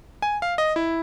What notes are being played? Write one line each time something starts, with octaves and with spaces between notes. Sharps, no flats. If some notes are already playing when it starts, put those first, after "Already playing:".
G#5
F5
D#5
E4